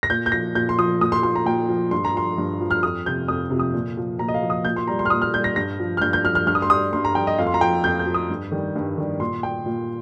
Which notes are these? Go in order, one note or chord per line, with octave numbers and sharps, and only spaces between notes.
A#6
A#2 G6
G6
F3 A#6
A#2 G6
C6
F3 D#6
A#2 D#6
C6
F3 C6
A#5
A#2 G5
F3
G2 C6
A#5
F3 C6
G2
F3
F6
F2 D#6
C3 F3 G6
F2 D#6
C3 F3
D#6
A#2
F3
A#2 A#5
D#5
F5
F3
D#6
A#2 G6
C6
G3 A#5
C6
F6
A#2 D#6
F6
G3 G6
A#6
G2 A#6
F3
F6
G2 G6
G6
F3 F6
F6
G2 F6
D#6
C6
G3 D#6
G2 C6
A#5
G3 G5
D#5
F2 F5
C6
A#5
F3 G5
F2 G6
G6
F3
D#6
G2
D#3 G3
G2
D#3 G3
A#2 C6
G3 G5
A#2